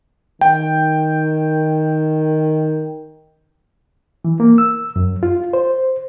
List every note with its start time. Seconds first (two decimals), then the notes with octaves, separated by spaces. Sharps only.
0.41 D#3 G5
4.25 E3
4.40 A#3
4.58 E6
4.96 F#2
5.23 F4
5.53 C5